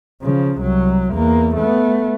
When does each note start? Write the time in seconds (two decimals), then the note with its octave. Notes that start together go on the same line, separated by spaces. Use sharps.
0.22 C#3 F3
0.60 C2 F#3
1.13 E2 A#3
1.56 A3 B3